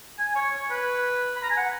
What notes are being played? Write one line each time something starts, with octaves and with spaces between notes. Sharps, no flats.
G#5
C#5
C#5
B4
B5
A#5
G#5
F#5